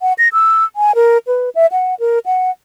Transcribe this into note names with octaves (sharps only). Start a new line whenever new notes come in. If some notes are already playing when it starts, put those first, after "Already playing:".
F#5
A#6
E6
G#5
A#4
B4
E5
F#5
A#4
F#5